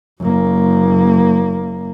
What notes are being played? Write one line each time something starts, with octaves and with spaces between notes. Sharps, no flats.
F#1 A#3